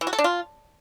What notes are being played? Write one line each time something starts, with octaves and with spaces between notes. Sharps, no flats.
E3
F#4
A4
D4
F4